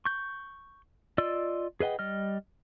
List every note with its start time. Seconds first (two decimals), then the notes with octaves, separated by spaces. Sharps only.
0.05 C#6 G6
1.18 F4 D5 D#5 E6
1.80 G#4 B4 D#5 F#5 G5
1.99 G3 D#5 F6